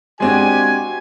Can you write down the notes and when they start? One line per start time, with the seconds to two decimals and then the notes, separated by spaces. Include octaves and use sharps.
0.20 G#3 C4 D4 F#4 G4 G#5